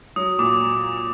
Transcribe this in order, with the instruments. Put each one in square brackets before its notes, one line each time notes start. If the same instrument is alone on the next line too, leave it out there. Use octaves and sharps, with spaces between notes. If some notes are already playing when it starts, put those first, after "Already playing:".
[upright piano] F#3 [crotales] D#6
[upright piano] A#2 [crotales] D6